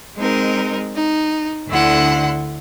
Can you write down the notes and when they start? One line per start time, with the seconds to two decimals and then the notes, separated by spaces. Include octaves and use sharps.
0.17 G#3 C4 D#4 A#4
0.96 D#4
1.69 D2 D3 E4 F#5 C6